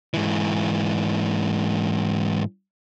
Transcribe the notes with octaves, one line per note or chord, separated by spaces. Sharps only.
G#2 E3